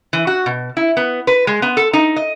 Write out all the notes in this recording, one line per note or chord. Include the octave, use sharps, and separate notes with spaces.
E3
F#4
B2
E4
B3
B4
G#3
B3
A4
D#4
D#5